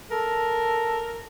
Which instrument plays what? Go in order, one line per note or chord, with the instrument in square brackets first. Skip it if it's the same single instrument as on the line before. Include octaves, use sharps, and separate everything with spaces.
[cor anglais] A4 [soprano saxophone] A#4